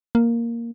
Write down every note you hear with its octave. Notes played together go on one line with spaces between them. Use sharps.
A#3